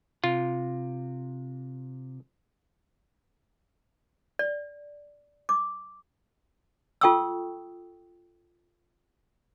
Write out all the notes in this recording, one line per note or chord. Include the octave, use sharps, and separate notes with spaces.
C3 F4
D5
D6
F4 A4 G5 C#6 D#6 E6